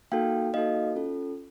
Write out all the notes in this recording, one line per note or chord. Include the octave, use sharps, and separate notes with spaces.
A#3 D#4 F#4 A4 F5 G5
A#3 D#4 F#4 A4 D#5 F5
C#4 F4 A4